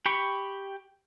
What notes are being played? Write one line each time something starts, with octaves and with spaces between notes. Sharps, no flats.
G4 G5 B5 C#6